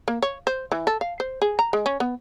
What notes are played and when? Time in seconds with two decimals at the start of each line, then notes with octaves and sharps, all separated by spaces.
0.08 A#3
0.22 C#5
0.47 C5
0.72 E3
0.87 A4
1.01 F5
1.20 C5
1.42 G#4
1.59 A#5
1.73 G#3
1.86 C#4
2.00 B3